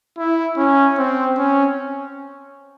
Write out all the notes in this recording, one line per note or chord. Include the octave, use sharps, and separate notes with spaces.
E4
C#4
C4
C#4